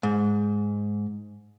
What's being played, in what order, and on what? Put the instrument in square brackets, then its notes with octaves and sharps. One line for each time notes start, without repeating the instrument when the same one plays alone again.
[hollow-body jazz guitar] G#2